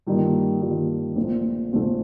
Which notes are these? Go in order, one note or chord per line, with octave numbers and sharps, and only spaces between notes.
G2 D#3 G3 A#3 F4
G2 D#3 G3 A#3 F4
A#1 A#2 A3 C4 F4
A#1 A#2 A3 C4 F4